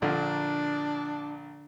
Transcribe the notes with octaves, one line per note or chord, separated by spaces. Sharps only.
A#1 A#2 D3 D4